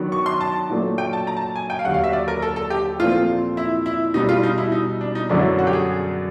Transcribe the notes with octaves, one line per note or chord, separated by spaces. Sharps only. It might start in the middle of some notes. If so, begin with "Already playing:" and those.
Already playing: D#3 F#3 B3 D4 F#4
C#6
C6
A5
A#2 F#3 A3 D4
G5
A5
A#5
A5
G#5
G5
F5
D#2 D3 F#3 F#5
F5
E5
D5
A#4
A4
A4
G4
A#2 F3 A3 C4 F4
E4
E4
B2 G3 B3 D#4
F4
D#4
E4
D#4
D4
D#4
F#2 D3 F#3 B3 D4 E4
F#4
G4
G#4